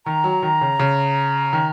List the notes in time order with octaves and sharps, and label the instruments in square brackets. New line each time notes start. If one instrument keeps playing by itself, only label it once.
[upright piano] D#3 [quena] A#5
[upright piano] F#3
D#3
C#3
C#3
D#3